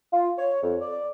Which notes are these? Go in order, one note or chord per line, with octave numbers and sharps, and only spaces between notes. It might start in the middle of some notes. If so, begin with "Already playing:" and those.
F4
C#5
F2
D5